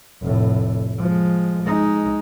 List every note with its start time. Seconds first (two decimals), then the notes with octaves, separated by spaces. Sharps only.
0.21 F1 A2
0.99 F3 G#3
1.63 G#3 D#4